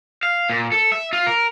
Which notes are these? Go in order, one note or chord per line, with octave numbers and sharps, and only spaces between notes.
F5
A#2
A4
E5
F4
A#4